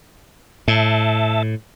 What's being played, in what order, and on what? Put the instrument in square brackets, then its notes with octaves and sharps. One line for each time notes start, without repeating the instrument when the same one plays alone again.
[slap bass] A2 [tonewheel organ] E5 A5